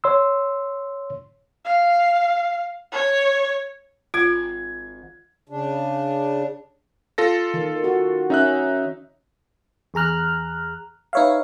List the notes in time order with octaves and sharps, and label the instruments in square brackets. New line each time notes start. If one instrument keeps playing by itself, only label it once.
[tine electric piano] C#5 C6 E6
[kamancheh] F5
C#5
[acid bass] G#1 [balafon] F4 [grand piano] G#6
[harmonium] C#3 D4
[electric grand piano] F4 A4 A#6
[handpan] D#3
F#4
[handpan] C#4 [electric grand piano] D#4 E5 F#6
[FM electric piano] E2 G#4 A#5 F6 F#6
D#4 B4 C#5 E5 F5